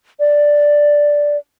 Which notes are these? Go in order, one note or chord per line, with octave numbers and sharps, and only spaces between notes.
D5